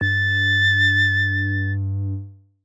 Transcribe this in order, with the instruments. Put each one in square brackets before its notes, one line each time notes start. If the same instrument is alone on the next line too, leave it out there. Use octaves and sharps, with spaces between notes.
[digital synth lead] G2 [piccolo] A6